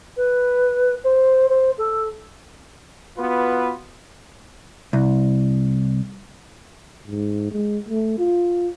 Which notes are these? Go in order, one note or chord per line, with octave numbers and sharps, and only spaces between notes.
B4
C5
C5
A4
B3 F4 F#4 B4
C2
G#2
G#3
A3
F4